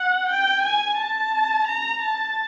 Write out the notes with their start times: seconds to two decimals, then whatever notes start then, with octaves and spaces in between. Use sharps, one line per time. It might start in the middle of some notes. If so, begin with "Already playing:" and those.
Already playing: F#5
0.29 G5
0.63 G#5
0.98 A5
1.67 A#5
2.02 A5